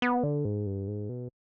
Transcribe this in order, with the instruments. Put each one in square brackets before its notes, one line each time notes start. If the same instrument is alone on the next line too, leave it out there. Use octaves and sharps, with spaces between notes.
[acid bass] B3
D3
G#2
G2
G#2
B2